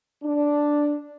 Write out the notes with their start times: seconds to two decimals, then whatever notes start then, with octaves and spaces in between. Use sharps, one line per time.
0.23 D4